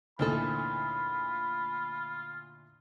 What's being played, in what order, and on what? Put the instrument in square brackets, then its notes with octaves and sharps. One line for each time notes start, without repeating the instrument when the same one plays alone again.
[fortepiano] D2 A#2 E3 [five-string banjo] C4 D#4 A4 [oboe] F4 [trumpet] B5